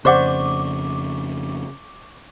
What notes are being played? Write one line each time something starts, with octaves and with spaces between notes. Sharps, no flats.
F2 C#3 C5 D5 F#5 C#6 D6